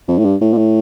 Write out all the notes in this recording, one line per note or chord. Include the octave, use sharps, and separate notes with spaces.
F2
A2
G2
A2
A#2
A2